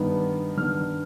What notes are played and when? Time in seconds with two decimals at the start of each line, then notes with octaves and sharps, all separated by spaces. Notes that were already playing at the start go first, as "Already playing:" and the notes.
Already playing: G2 D#3 B3 D4
0.57 G2 D#3 B3 D4 F6